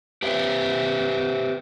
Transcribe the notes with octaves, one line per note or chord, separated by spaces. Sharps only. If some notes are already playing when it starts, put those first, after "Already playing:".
G4 B4 C5 E5